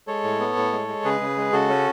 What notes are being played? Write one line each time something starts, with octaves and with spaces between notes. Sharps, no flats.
G#3 A4 C#5
A2
B3
A2
G#3
G#3
C#3 G#4 B4
C#3
G#3 B4
C#3 F#4 A4
C#4